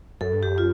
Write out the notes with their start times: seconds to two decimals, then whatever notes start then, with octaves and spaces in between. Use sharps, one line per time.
0.21 F#2 A4
0.33 G2
0.43 F#2 G4
0.58 F4